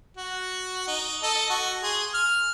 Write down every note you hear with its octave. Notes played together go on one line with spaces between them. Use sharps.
F#4
D#4
A4 D#5
F#4
G#4 C6
F6